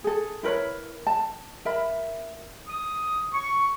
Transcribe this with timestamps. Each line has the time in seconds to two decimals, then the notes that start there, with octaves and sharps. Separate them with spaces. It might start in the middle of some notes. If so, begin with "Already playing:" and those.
0.04 G#4 A4
0.43 E4 A#4 B4 C#5
1.07 A5
1.65 A#4 E5 B5
2.68 D#6
3.34 C#6